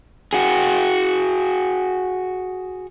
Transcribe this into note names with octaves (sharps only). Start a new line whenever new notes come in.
F#4 G#4